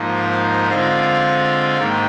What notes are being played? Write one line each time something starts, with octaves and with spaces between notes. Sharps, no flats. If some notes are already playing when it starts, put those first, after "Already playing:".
Already playing: G#2 F3 A#3 D#4
F5
D3 G#3 C4 F4 F5
G#2 D#3 A#3 G5